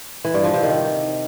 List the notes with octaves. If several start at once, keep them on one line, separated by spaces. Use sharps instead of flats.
E3
G2
F3
C3
D#3